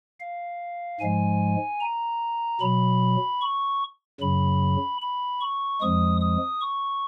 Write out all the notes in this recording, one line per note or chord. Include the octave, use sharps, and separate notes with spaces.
F5
G#2 F3 G#3 G#5
A#5
B2 F#3 B5
C#6
F#2 C#3 F#3 B5
B5
C#6
F2 F3 G#3 D#6
D#6
C#6